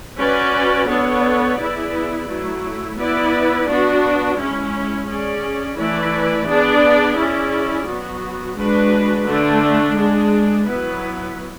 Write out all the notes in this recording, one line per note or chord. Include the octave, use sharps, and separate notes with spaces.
C#4 F#4 B4 D5
B3 D4 A4 C#5
B3 E4 G#4 B4 D5
F#3 A3 E4
B3 E4 B4 D5
B3 D4 F#4
G#3 C#4 E4
C#4 G#4 D5
E3 A3 E4 B4 D5
B3 D4 G#4 D5
C#4 E4 G#4 D5
F#3 B3 F#4
G#3 D4 F#4 B4
D3 A3 D4
G#3 D4 G#4
F#3 B3 E4 B4